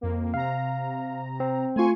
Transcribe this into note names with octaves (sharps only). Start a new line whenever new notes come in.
F2 A#3
C3 F5 A#5
C4
A3 F4 G#5 C6 C#6